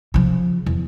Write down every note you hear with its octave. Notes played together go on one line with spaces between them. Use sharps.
C#3 F3
E2